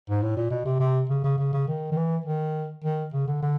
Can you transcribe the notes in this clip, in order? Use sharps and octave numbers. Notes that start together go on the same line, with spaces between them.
G#2
A2
A#2
B2
C3
C3
C#3
C#3
C#3
C#3
D#3
D#3
E3
D#3
D#3
C#3
D3
D3